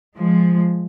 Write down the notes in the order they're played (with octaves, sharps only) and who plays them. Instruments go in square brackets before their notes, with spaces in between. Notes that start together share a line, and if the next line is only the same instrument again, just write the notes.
[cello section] F3 G#3